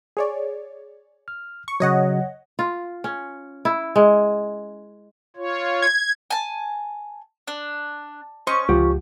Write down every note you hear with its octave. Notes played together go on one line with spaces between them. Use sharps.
G#4 C#5 D5
F6
C#6
C#3 F#3 C#5 D#5 F#5
F4
C#4
E4
G#3
F4 C#5
G#6
G#5 A5
D4
C#4 C5 D#5 C6 C#6
C#2 F3 G4 F#5